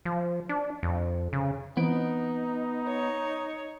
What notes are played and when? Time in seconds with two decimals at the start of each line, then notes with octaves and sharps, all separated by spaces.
0.05 F3
0.49 D4
0.83 F2
1.33 C#3
1.77 E3 B3 C4 D#4 D7
2.87 C#5